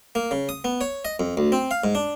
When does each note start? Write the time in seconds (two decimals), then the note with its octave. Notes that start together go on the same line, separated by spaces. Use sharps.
0.15 A#3
0.31 C#3
0.49 D#6
0.64 B3
0.81 C#5
1.05 D#5
1.20 F2
1.37 D2
1.52 C4
1.71 F5
1.84 G#2
1.95 D4